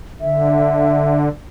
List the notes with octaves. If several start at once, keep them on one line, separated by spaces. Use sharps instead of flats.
D3 E5